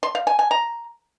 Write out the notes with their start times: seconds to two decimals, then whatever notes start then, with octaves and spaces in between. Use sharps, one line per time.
0.03 C6
0.15 F5
0.27 G#5
0.39 G#5
0.51 A#5